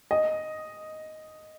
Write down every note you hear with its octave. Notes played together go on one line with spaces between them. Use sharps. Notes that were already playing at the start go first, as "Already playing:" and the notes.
D#5